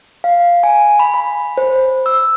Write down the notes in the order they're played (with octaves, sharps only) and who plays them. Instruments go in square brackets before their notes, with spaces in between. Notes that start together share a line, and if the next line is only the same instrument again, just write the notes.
[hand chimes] F5
G#5
B5
B5
C5
E6